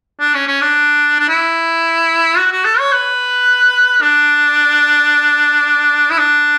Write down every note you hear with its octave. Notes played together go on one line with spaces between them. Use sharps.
D4
C#4
C#4
D4
D4
E4
F#4
F#4
A4
C#5
B4
D4
E4
D4